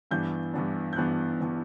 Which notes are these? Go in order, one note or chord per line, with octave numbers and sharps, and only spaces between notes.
G2 E3 B3 D4 G6
G2 E3 B3 D4
G6
G2 E3 B3 D4 F#6
E3 B3 D4